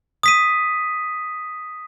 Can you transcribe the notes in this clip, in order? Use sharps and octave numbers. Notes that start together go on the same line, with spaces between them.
D#6 B6 D#7